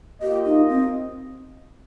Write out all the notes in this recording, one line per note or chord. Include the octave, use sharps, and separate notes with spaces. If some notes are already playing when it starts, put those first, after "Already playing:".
A#3 F4 G4 D#5
D#4
C4